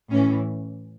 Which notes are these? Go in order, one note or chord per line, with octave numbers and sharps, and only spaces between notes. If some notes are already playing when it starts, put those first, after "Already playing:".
A2 E3 C#4